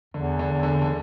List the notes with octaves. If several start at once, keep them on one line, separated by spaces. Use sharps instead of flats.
E2 D3
D3
E2
D3
D3